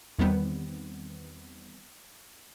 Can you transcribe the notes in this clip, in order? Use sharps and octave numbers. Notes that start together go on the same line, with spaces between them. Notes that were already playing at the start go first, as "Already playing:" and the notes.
E2 D#3 G3 B3 C4